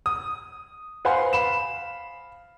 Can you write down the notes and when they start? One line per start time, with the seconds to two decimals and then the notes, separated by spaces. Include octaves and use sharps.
0.06 D#6
1.05 B4 C5 F5 F#5 G#5 C6
1.33 F5 B5 E7